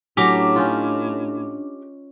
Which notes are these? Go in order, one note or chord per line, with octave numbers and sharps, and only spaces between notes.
A2 F#3 C#4 D4 G4 A#5 D6
C#4 D#4 F4